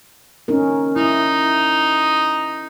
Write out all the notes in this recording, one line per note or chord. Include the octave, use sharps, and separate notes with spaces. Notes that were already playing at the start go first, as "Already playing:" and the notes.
C#4 D#4 A#4
D#4 E4